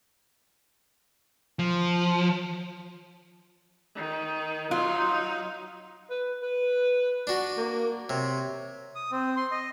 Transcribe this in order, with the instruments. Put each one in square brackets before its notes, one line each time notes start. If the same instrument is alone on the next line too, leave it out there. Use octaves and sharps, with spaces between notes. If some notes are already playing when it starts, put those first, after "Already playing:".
[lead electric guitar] F3
[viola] D#3
[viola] F#3 D#4 [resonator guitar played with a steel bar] F4
[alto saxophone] B4
B4
[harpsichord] D4 F#4
[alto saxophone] A#3
[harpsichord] C3 [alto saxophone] C#5
[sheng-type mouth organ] D#6
C4
C6
D#5